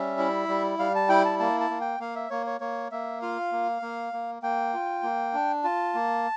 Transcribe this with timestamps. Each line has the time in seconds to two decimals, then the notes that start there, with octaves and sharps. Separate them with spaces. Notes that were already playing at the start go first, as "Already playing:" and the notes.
Already playing: G3 C#4 E5
0.19 E4
0.48 G3
0.79 G3 F5
0.95 A5
1.09 E4 G5
1.25 A5
1.39 A#3 A5
1.60 A5
1.70 A#3
1.81 G5
2.00 A#3 F5
2.16 E5
2.30 A#3 C#5
2.46 C#5
2.60 A#3 C#5
2.92 A#3 E5
3.22 F4 F5
3.52 A#3
3.82 A#3
4.13 A#3
4.42 A#3 G5
4.73 F4
5.03 A#3
5.34 D4
5.64 F4 A5
5.95 A#3